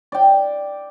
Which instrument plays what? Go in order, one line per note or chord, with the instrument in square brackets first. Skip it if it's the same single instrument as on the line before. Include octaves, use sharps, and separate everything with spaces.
[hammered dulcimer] D5 G5